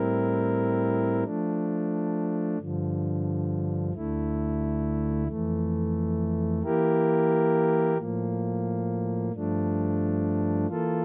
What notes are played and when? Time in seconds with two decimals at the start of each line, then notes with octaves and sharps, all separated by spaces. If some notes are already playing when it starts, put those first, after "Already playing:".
Already playing: A2 G3 C4 E4 A#4
1.24 F3 A3 D4
2.58 G2 D3 F3
3.93 D2 D3 A3 E4
5.27 F2 E3 A3
6.63 E3 A#3 E4 G4 A#4
7.97 A2 F3 A#3
9.32 G2 F3 A3 D4
10.66 E3 A#3 F4 A4